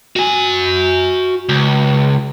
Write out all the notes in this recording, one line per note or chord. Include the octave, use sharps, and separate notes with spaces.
F#4 G#5
C#2